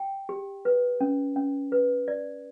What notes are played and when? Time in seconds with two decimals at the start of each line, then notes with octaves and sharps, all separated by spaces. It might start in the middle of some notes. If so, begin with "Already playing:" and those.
Already playing: G5
0.29 G4
0.65 B4
1.01 C#4
1.36 C#4
1.72 B4
2.08 D5